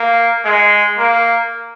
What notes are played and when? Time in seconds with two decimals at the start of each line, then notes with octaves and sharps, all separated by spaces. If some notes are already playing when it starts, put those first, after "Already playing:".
Already playing: A#3
0.45 G#3
0.98 A#3